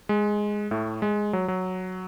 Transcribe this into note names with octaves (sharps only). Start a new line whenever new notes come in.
G#3
A2 A3
G#3
F#3
F#3